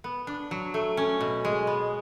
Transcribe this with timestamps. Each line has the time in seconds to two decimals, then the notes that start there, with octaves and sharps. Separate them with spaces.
0.04 B3
0.27 D4
0.51 F#3
0.74 A3
0.97 C#4
1.21 B2
1.45 G#3
1.67 B3